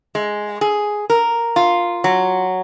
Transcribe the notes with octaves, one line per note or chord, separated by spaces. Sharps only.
G#3
G#4
A#4
F4
F#3